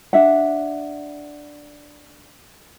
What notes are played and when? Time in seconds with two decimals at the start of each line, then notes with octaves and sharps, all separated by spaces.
0.13 D4 E5 F#5